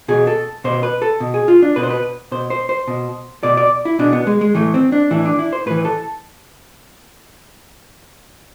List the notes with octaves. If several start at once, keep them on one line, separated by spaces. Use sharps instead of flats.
B2 G#4
A4
B2 C5
B4
A4
B2
G#4
F4
D4
B2 B4
C5
B4
B2 C5
C5
C5
B2
B2 D5
D5
E4
B2 D4
B3
G#3
G#3
A2 E3 A3
C4
D4
A2 E3 E4
D4
E4
C5
A2 E3 B4
A4